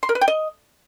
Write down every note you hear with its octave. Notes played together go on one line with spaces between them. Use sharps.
C6
A#4
B4
G5
D#5